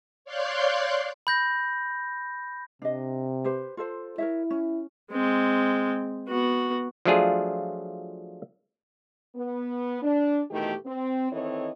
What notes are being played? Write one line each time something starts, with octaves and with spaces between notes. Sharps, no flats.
C#5 D5 F5 C6 F#6 G6
B5 G6 A#6
C3 D4 D#5
G4 B4 C5
F4 A4 C5
E4 A#4 C#5 E5
C#4
G#3 C4
B3 F#4
F3 F#3 A3 D4 F4 G#4
B3
D4
B2 D#3 E3 A3 G4
C4
D#3 E3 C4 A4 C#5 D#5